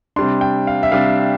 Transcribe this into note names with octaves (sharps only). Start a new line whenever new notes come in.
C3 G3 D4 C6
G5
F5
E5
C3 G3 D4 F5